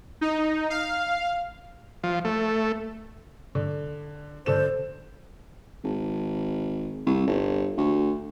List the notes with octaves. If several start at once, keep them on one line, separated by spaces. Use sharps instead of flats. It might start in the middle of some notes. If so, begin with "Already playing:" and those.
D#4
F5
F3
A3
D3
D3 A4 C5 E7
G#1
C2
G1
D2